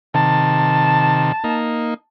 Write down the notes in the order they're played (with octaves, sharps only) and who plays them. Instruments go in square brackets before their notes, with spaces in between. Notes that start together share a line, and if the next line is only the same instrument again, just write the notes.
[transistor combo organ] C3 D#3 [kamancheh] A5
[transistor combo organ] A#3 D#4